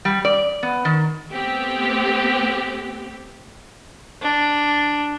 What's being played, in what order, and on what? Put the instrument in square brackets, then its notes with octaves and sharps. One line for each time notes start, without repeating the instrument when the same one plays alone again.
[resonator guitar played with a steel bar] G3
D5
B3
D#3
[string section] A3 B3 C4 G4
[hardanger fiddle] D4